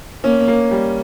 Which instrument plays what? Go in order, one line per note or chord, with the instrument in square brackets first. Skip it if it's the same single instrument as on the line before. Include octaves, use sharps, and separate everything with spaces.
[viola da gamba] A#3 [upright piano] C#4
[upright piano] A#3
G3